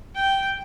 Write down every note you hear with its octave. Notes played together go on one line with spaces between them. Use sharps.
G5